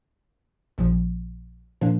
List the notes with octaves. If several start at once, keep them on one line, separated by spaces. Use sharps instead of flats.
A#1 A#2 F3
A#2 F3 A#3 D4